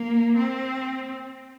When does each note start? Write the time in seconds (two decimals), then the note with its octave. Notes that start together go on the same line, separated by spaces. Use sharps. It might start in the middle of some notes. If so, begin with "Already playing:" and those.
Already playing: A#3
0.37 C4